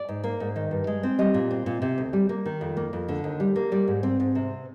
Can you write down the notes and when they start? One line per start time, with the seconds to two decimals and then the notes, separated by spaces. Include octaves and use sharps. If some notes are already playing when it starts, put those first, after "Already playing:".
Already playing: D5
0.09 G#2
0.24 A#3
0.40 G#2
0.56 D#3
0.71 G2
0.87 G#3
1.03 C4
1.19 G3 D#5
1.34 A#2
1.51 C4
1.66 A#2
1.82 C3
1.98 D2
2.13 G3
2.29 A#3
2.46 D#3
2.61 F2
2.77 A#3
2.93 F2
3.08 D3
3.24 D#2
3.40 G3
3.56 A#3
3.72 G3 D5
3.88 G#2
4.03 C4
4.20 G#2
4.35 C3